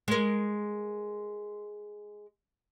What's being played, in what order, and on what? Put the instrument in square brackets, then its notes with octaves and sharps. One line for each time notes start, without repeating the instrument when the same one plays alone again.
[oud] G#3 A#4